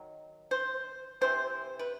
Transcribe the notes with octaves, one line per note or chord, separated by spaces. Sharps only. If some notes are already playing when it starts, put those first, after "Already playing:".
Already playing: D#3 F#3
C5
C3 E3 A3 C4 C5
B4